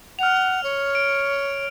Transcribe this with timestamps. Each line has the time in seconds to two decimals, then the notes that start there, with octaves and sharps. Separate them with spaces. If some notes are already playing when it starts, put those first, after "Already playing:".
0.19 F#5 F6 F7
0.63 C#5
0.95 D7